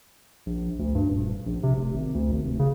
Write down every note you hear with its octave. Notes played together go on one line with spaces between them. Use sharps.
A#1
D2
G2
D#1
A#1
C3
F1
G#1
D2
G#1
F1
C#3